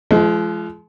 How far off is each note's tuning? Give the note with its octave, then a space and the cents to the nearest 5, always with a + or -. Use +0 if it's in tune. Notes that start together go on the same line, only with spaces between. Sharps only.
F3 -25 G#3 +35